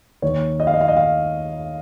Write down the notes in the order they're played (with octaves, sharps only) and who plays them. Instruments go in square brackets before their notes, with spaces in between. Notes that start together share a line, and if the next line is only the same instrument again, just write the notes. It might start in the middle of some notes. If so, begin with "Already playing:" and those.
[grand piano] D#2 D#3 C#5
D#5
F5
D#5
F5
D#5
F5